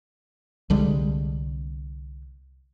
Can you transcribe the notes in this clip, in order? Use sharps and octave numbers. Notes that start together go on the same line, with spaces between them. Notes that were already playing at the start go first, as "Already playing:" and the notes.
C2 D3 G3 G#3